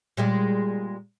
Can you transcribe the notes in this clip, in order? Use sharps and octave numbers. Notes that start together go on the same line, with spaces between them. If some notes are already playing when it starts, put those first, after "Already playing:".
A#2 G3 G#3